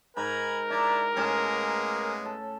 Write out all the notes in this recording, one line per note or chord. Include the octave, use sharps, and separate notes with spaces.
G#2 A#4 G#5 A#5 B5
D4 E4 D5 A#5 D6
A2 G#3 A#3 B3 C#4
A4